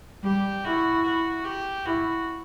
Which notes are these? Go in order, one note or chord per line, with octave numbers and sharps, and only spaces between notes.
G3 G4
E4 F#4
F#4
G4
E4 F#4